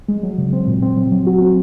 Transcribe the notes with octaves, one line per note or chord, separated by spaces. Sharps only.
G#3
F#3
C#3
C4
A#2
C4
F#3
F#3
F#4
C4